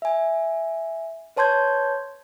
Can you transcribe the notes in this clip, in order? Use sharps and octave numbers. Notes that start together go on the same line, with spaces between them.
E5 G#5
B4 C#5 A5 C6 G6 G#6